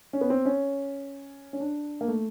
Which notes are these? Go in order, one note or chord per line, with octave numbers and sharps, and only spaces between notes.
C#4
B3
C4
C#4
C#4
D4
A#3
A3